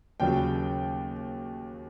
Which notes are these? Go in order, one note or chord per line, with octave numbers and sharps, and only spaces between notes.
D#2 C#3 F#3 G5